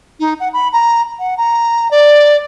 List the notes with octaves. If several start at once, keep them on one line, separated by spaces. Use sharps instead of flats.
D#4
F#5
B5
A#5
F#5
A#5
D5